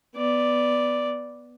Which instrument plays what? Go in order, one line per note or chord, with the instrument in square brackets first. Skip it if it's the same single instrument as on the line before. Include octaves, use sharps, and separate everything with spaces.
[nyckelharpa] B3 D5